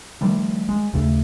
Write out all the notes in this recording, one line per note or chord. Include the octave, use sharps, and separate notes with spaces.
D#3 F3 G3 A3
G#3
D#2 C#3 A3